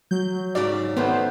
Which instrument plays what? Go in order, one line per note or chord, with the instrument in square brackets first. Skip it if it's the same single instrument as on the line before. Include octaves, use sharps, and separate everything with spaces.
[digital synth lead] F#3 [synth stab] G6
[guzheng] G#2 C#3 [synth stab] F#4 D5
[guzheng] D#3 A3 B4 [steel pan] B3 [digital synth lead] C5